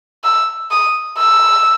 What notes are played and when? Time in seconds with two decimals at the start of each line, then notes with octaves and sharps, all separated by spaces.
0.24 E6
0.71 D#6
1.18 E6